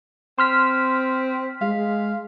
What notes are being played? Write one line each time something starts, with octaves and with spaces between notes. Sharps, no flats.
C4 C6 F6 B6
G#3 F5